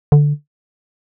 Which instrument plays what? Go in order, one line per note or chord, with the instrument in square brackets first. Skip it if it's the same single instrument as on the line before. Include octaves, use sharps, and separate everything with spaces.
[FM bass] D3